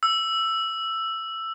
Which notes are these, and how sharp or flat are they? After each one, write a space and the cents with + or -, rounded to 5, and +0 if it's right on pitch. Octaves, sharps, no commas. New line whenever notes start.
E6 +10